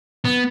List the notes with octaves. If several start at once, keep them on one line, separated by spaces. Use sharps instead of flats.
B3